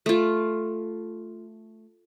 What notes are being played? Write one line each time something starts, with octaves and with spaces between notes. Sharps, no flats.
A3 F4